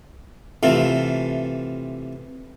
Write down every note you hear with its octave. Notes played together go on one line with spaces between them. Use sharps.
C3 E3 A3 F4